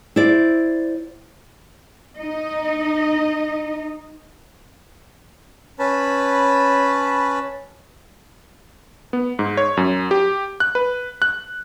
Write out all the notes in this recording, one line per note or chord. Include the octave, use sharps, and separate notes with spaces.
E4 C5 D5
D#4 D#5
C#4 B4 A5 B5
B3
G#2
C#5
F#2
G4
F#6
B4
F#6